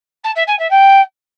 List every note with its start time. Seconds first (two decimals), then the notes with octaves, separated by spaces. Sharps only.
0.24 A5
0.35 E5
0.47 G#5
0.59 E5
0.70 G5